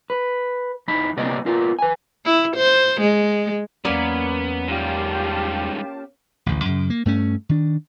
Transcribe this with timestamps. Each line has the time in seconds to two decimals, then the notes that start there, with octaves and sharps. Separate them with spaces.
0.10 B4
0.88 E2 D#4 B5
1.17 C2 C3 A#3 B3 D5 D#5
1.46 B3 F4 A#4
1.79 B4 G#5
2.25 E4
2.57 C5
3.01 G#3
3.85 E2 F#3 A#3 B3 C#4 D5
4.68 G#2 G3 F4 G4 A5
6.46 A1 D2
6.65 F#2 C#3
6.90 A#3
7.05 G2 A3 C#4
7.49 D#3 D4